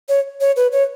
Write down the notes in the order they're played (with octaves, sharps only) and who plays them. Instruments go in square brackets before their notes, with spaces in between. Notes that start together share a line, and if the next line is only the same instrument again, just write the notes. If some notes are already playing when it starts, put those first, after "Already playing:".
[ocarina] C#5
C#5
B4
C#5